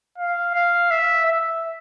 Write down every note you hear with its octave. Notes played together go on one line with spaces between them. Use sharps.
F5
F5
E5
E5